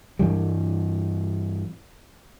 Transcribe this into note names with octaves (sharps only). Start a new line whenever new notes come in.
G2 E3 G3